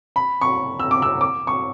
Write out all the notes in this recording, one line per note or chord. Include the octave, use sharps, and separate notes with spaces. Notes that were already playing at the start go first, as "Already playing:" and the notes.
B5
C#6
E6
D6
E6
D6
C#6